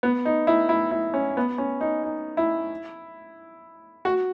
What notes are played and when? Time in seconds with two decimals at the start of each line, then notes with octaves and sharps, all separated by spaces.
0.03 B3
0.25 D#4
0.47 E4
0.69 E4
0.91 E4
1.14 C#4
1.37 B3
1.58 C#4
1.81 D#4
2.04 D#4
2.37 E4
4.05 F#4